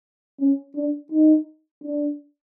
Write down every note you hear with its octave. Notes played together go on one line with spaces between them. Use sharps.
C#4
D4
D#4
D4